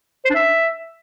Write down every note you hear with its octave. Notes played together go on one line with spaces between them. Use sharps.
C5
D4
E5